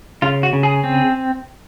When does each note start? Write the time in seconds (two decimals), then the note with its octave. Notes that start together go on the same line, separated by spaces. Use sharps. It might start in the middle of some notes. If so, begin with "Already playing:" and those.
0.22 C#3 F4
0.43 F#4
0.53 C#3
0.63 G#4
0.84 C4